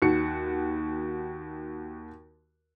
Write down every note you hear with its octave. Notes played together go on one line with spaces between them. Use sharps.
D#2 F#4 C#7